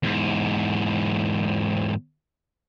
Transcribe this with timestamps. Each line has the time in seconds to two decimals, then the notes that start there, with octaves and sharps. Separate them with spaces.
0.03 E2 G#2